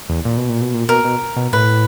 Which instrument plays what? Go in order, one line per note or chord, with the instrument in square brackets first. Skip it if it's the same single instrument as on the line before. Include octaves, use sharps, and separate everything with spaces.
[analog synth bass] E2
A#2
B2
A#2
B2
A#2
[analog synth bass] B2 [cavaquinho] A#4
[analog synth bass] B2
B2
[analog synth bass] A2 [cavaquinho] B4